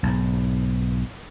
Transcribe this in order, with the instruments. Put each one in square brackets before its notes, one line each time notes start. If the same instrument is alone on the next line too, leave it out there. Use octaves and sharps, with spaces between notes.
[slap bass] B1 G#2